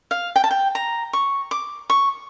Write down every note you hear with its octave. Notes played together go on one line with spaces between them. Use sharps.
F5
G5
A5
G5
A#5
C#6
D6
C#6